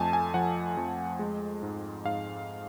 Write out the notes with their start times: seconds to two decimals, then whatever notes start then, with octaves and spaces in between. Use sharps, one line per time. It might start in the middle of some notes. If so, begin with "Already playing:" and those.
Already playing: F2 A3 G#5 A5
0.13 G#5
0.34 F3 F#5
0.77 F2
1.19 G#3
1.63 G#2
2.05 G#2 F5